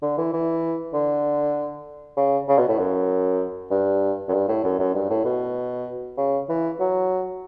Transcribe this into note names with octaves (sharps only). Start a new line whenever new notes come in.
D3
E3
E3
D3
C#3
C#3
B2
A2
F#2
G2
F#2
G2
A2
F#2
F#2
G2
A2
B2
C#3
E3
F#3